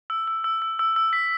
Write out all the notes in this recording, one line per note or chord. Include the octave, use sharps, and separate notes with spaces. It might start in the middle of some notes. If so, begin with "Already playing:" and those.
E6
E6
E6
E6
E6
E6
B6